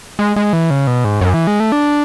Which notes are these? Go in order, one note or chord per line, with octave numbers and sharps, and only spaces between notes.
G#3
G#3
E3
C#3
B2
G#2
F#2
E3
G#3
A3
D4